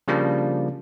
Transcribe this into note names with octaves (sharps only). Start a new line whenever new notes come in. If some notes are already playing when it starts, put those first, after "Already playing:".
C#3 F3 G3 A#3 D4